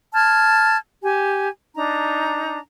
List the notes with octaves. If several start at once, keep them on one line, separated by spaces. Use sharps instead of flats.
A5 F6 G#6
G4 G#5
D4 D#4 A#5